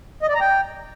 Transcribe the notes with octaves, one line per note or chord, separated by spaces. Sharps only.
D#5
D5
A#5
G5